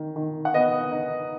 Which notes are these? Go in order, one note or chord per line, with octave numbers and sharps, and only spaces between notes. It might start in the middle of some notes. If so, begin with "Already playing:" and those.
Already playing: D#3
D#3
F#5
B3 D#5
D#4